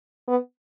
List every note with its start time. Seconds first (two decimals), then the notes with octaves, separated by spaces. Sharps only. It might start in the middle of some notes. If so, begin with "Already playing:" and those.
0.28 B3